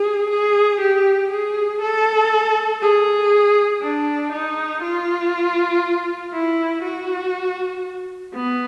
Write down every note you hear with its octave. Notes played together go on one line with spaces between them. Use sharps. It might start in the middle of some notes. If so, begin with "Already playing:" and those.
Already playing: G#4
G#4
G4
G#4
A4
G#4
D4
D#4
F4
E4
F#4
B3